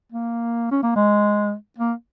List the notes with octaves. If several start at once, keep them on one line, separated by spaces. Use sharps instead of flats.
A#3
C#4
A#3
G#3
A#3